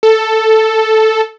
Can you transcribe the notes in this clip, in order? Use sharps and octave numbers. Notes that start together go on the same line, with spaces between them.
A4